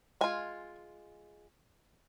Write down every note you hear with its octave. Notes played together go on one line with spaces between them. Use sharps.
G#3 F4 G#5